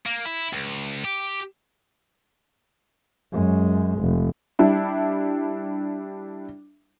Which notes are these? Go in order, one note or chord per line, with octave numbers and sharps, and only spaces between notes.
A#3
E4
C#2
G4
F#2 G#3
F1
G3 D4 E4